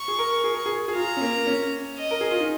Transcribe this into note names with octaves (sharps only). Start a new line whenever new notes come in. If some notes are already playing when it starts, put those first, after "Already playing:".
Already playing: C#6
G#4
A#4
G#4
A#4
G#4
G#4
F4 A#5
C#4
A#3
C#4
D#5
A#4
G#4
F4
D#4